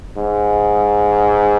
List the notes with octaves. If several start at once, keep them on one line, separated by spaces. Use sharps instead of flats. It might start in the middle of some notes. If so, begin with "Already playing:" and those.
G#2